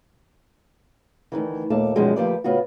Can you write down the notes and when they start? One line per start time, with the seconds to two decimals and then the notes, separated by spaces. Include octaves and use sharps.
1.32 D2 G#2 D#3 E3
1.70 D#2 A#2 A3 D5 A5
1.96 F#2 B2 D#3 F3 G3 G#3
2.16 D2 F3 A#3 G4 B4 D5
2.44 A2 C#3 B3 F4 F#4